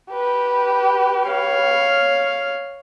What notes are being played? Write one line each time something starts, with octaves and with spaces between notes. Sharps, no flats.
G4 B4
C#5 F5